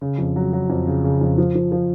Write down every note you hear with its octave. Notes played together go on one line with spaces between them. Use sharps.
C#3
F2
F#3
F#3
F2
C#3
C#3
F2
F3
F3
F3